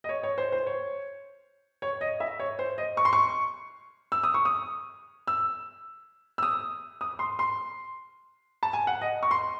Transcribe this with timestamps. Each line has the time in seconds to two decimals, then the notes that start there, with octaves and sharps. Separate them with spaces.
0.04 D#5
0.09 C#5
0.23 C#5
0.38 C5
0.52 C5
0.67 C#5
1.82 C#5
2.01 D#5
2.20 E5
2.40 C#5
2.59 C5
2.78 D#5
2.97 C#6
3.05 C6
3.13 C#6
4.12 E6
4.23 D#6
4.34 C#6
4.45 D#6
5.27 E6
6.38 E6
6.43 D#6
7.01 D#6
7.19 C6
7.39 C6
8.63 A5
8.73 G#5
8.87 F#5
9.01 D#5
9.23 C#6
9.31 C6